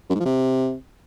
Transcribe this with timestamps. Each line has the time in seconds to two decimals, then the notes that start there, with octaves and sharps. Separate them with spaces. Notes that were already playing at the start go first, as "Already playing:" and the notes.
0.10 F#2
0.15 G#2
0.20 F3
0.25 C3